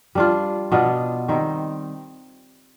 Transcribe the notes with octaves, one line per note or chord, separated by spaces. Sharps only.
G3 D4 F4
B2 B3 D4 F4
D#3 G3 C4 D#4